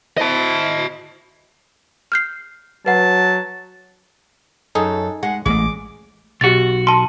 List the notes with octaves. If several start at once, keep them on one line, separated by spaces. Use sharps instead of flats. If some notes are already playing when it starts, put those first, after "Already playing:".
E4 C5 D#5 A5
F6 G6 C7
F#3 B4 F#5 A5
F#2 D#4 G#4 A4
G#3 F#5
A1 G#3 A3 D6
B1 F#4 G4 A6
A5 C6